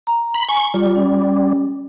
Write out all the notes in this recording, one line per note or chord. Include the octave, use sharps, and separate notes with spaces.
A#5
B5
G#5 C#6
G3 F4
C#4